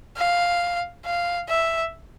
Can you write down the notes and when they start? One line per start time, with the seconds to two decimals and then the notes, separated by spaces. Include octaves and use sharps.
0.17 F5
1.05 F5
1.49 E5